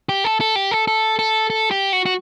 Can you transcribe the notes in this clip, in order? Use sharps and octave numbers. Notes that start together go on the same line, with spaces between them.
G4
A4
A4
G4
A4
A4
A4
A4
G4
F#4
F#4